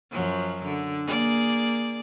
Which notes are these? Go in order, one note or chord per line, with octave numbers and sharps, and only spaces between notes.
F#2 F3 F#3
D3
A#3 G#4 D5